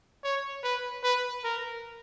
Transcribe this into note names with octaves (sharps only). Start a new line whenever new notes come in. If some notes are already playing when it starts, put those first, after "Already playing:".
C#5
B4
B4
A#4